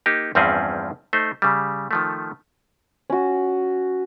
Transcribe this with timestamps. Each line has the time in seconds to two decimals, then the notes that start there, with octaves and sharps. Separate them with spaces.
0.06 A#3 D#4 G4
0.35 E2 G2 F3 C4 C#4 G#4
1.13 A3 D#4 C5
1.42 C#3 G3
1.91 D#3 F3 A3
3.10 C#4 F#4